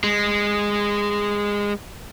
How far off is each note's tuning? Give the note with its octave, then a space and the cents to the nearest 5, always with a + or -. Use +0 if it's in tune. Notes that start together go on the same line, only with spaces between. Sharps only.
G#3 -15